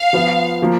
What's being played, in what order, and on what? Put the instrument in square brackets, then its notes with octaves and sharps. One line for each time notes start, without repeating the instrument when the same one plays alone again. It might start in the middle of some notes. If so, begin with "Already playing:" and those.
Already playing: [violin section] F5
[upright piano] F3 B3 F4
F3 A#3